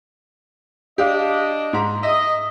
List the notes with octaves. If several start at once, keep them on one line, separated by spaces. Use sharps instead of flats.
D4 G4 D#5 F5
G#2 A#5
D#5 E5